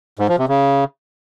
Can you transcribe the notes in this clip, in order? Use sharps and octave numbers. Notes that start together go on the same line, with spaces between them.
G#2
F3
C3
C#3